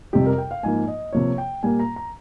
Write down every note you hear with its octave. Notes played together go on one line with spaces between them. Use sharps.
F2 C3 G3 G4
A#4
G5
F5
G#2 F3 A#3 G#5
D#5
C3 F3 A#3 C#5
G5
A#2 G3 A#3 G#5
A#5
A#5